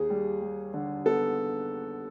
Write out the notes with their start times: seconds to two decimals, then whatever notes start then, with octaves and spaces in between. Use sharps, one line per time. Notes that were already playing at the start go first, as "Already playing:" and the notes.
Already playing: D#2 G#4
0.10 G3
0.42 G3
0.74 D3
1.06 B3 A4